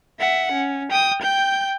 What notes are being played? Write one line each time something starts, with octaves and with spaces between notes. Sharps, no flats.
E5 F#5
C#4
G5 D#6
G5 G6